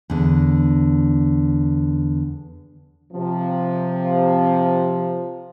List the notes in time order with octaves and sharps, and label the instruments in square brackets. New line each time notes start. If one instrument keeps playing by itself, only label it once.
[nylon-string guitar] E2 D3
[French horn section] C3 F3